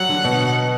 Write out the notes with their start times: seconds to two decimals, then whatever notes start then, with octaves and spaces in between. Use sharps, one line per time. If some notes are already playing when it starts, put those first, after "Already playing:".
Already playing: F#3 G3 F#5
0.09 D3
0.24 B2